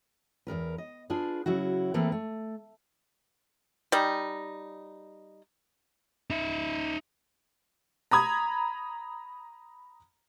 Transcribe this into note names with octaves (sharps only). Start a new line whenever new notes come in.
E2 C#3 A#4 B4
D#5
D4 F4 G#4 B4
C#3 F#3 E4 F#4
E3 A3 A#3 C4 G#4 B4
A3
G3 D#4
D#4 E5
A#5 B5 D#6 G#6